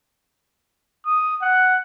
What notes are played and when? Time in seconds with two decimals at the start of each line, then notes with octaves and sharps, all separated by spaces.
1.06 D#6
1.42 F#5